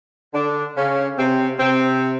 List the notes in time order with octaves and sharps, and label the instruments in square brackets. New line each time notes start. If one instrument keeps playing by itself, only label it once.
[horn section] D3 D4
C#3 C#4
C3 C4
C3 C4